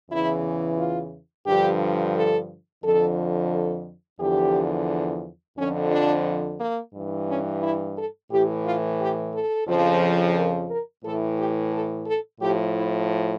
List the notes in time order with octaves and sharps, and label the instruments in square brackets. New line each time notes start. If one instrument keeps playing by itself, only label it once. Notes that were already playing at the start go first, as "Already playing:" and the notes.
[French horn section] E2 C#3 E3 E4
F4
G2 D3 F3 G4
A4
F2 D3 F3 A4
A4
E2 D3 F3 G4
F2 D3 F3 C#4
D4
A#3
G2 E3
C#4
E4
A4
A2 E3 G4
F4
G4
A4
F2 C#3 F3
A#4
A#4
A2 E3 A4
G4
A4
A4
A2 F3 G4
E4